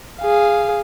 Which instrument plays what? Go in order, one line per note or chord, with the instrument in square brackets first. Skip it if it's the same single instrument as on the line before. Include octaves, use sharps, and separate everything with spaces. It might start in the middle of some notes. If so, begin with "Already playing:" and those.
[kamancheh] G#4 F5